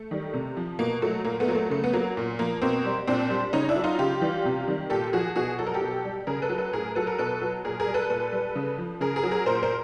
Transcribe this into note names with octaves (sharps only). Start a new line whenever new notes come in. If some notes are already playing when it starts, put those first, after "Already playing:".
Already playing: A3
D#3 G3
C3
F3
B2 A#3
F#3 A3
A#2 A#3
A3 B3
F#3 A#3
A3
C#3 A3
B3
F#3 A#3
A#2
F3 A#3
B2 A#3 C4
G3
A#2 C4 D4
G3
C#3 C#4 D#4
D4 E4
F#3
D#4 F4
C#3 F4 G4
E3 G3
C3
D#3 G3
A#2 G4 A4
F3 F#4 G#4
B2 F#4 G#4
F#3 A4
A#4
G4 A4
B2
G3
C#3 G#4 A#4
A4 B4
F#3
A4 B4
A2 G#4 A#4
F#3 A4 B4
A#4
B2 A4 B4
F#3
A#2 G#4 A#4
G#4 A#4
G3
A4 B4
A#2 A4 B4
G3
C#3
F3
C#3 G#4 A#4
G#4 A#4
F#3
G#4 A#4
A#2 A#4 C5
A#4 C5